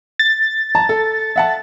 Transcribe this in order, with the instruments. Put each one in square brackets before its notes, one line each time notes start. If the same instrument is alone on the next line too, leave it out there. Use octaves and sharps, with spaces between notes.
[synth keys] A6
[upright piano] A5 A#5
A4
E5 F#5 A5